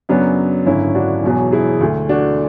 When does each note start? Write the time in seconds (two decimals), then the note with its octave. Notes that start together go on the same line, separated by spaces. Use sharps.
0.09 F#2 C#3 F#3 B3 D4
0.66 G#1 F#2 D3 C#4 E4
0.95 D4 F#4
1.23 E1 E2 B2 F#3
1.52 E4 G#4
1.81 D2 D3 A3
2.09 D4 F#4